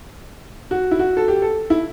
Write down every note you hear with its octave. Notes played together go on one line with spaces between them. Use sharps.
F#4
E4
F#4
A4
G4
A4
E4